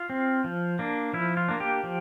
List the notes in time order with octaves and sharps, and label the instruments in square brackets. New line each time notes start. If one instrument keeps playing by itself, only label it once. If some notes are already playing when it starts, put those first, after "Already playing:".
Already playing: [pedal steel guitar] F4
C4
F3
A#3 D4
F3 E4
F4
A#3 D4
G4
F3